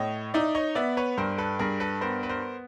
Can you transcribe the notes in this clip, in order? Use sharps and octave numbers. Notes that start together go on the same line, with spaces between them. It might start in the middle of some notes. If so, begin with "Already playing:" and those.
Already playing: A2 C#5 D#5
D#4 D5 E5
C#5 D#5
B3 D5 E5
B4 C#5
G2 A#4 C5
A4 B4
G2 G#4 A#4
A4 B4
B3 A#4 C5
B4
A#4 C5